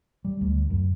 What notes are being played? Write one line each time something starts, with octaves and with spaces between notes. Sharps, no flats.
G3
D2
F#2